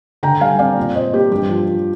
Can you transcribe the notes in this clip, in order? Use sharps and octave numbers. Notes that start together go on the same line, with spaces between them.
D3 G5 A#5
G3 F5 G#5
C4 D5 F5
A#2
A#2 C5 D#5
A#3 G4
G2 G4
F3
F3